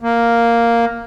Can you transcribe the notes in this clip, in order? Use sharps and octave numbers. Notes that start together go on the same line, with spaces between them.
A#3